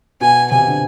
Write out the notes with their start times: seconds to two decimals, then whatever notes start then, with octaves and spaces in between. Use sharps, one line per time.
0.21 B2 G#5
0.51 C3 G#5
0.66 D3